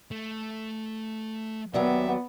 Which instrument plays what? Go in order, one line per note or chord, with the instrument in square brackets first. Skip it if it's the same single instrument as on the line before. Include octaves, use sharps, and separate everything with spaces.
[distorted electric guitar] A3
[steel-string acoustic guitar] D#2 F#3 D5 [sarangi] B3 [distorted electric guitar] E5